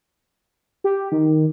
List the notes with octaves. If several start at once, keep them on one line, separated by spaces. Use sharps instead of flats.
G4
D#3